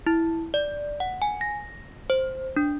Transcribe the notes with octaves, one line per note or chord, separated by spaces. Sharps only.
E4
D5
F#5
G#5
A#6
C5
D4